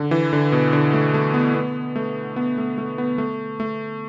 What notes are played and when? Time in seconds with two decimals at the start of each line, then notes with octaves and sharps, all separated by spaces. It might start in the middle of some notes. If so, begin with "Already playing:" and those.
Already playing: D3
0.11 E3
0.33 D3
0.52 B2
0.73 D3
0.93 A3
1.14 A3
1.34 B3
1.55 B3
1.96 A3
2.36 B3
2.58 A3
2.78 A3
2.98 B3
3.18 A3
3.60 A3